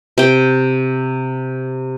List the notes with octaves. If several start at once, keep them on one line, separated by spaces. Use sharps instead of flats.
C3 G5